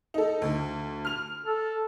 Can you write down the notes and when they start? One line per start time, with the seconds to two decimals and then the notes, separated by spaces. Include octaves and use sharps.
0.14 D#4 A4
0.42 D2
1.05 F6 F7
1.46 A4